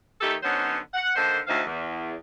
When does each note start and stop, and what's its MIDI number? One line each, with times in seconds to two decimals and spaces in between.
0.21 0.35 51
0.21 0.35 57
0.21 0.35 63
0.21 0.35 67
0.21 0.35 69
0.43 0.77 50
0.43 0.77 54
0.43 0.77 59
0.43 0.77 61
0.43 0.77 63
0.43 0.77 72
0.94 1.14 78
1.16 1.38 50
1.16 1.38 51
1.16 1.38 58
1.16 1.38 69
1.16 1.38 72
1.47 1.61 38
1.47 1.61 45
1.47 1.61 63
1.47 1.61 72
1.47 1.61 77
1.66 2.14 40